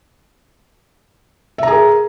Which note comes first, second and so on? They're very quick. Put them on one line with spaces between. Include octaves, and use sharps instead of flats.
E5 A#5 G#4 A#4